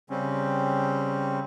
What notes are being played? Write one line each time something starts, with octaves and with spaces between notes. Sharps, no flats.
C#3 G3 C4 C#4